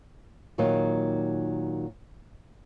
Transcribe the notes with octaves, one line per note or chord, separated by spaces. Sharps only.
A#2 D#3 F#3 A#3 D#4